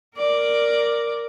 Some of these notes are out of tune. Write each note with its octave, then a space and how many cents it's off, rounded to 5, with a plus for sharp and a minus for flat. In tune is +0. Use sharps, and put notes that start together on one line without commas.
A#4 +0 D5 +0